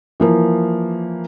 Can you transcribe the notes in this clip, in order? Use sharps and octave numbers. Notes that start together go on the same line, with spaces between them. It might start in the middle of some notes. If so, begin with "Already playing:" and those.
E3 F3 A#3